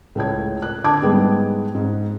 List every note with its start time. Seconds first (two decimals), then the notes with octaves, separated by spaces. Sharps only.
0.15 C#2 A2 A4 C#5 G#6
0.62 F#6
0.84 D3 A5 D6 G#6
1.02 G#2 G3 G#3 B3
1.75 G#2